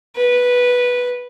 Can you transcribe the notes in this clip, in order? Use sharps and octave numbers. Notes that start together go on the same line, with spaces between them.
B4